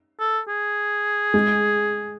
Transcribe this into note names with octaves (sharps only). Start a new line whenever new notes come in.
A4
G#4
G#3